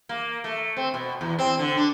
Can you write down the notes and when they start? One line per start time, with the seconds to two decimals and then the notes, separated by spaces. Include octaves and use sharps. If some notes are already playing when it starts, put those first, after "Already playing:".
0.09 A#3
0.44 A3
0.77 C4
0.94 B2
1.21 E2
1.39 C4
1.59 D3
1.77 D4